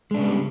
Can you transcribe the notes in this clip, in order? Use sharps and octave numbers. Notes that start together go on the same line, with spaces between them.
C#3 G3 G#3 B3 D4